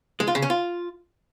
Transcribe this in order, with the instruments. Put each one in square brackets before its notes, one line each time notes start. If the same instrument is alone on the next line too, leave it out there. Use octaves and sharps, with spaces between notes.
[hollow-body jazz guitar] G#3
F4
C#3
C#4
F4